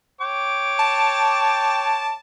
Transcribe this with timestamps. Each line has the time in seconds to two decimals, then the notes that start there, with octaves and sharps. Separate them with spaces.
0.21 C#5 G5 D6
0.79 A5